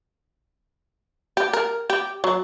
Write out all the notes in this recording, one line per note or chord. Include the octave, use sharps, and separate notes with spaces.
G4
A#4
G4
F#3